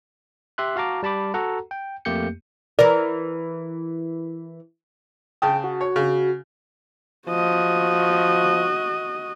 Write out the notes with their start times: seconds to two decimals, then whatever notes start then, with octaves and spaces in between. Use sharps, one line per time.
0.58 G4 E5 C6 F#6
0.76 F#4 F5 A5 A#5 D6
1.03 G3 A5 B5 D6
1.34 F#4 A4 F#5 A#5
1.71 G5
2.05 F2 A3 A#3 G4 G6 C#7
2.79 E3 A#4 D5
5.42 C#3 G5 A5 D#6
5.64 F#4
5.81 C#5
5.96 C#3
7.28 F3 F#4 D#5